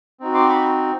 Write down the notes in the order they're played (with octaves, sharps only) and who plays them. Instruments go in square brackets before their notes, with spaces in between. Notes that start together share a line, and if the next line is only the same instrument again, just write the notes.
[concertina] C4 D#4 F#4
C6 D6
B5 C#6